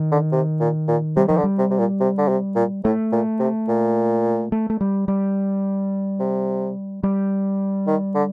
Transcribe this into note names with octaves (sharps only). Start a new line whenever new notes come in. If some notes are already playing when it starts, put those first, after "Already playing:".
Already playing: D#3
D3
C3
A#2
A#2
C3 G3
D#3 F3
D3
G3
C3
C3
A#2
C3
D3
C3
A#2
A2 A3
A#2
C3
A#2
A3
A3
G3
G3
C3
G3
D#3
D3